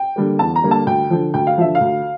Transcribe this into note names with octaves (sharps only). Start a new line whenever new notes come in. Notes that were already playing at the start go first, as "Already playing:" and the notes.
Already playing: G5
D3 G3 A#3
E2 A5
A#5
D3 G3 A#3
A5
D2 G5
D3 F3
D2 G5
F5
D3 F3 E5
F5
D2